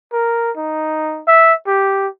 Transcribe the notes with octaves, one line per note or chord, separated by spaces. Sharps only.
A#4
D#4
E5
G4